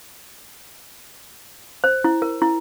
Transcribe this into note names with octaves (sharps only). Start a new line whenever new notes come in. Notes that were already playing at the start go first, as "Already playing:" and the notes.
C5
E4
A#4
E4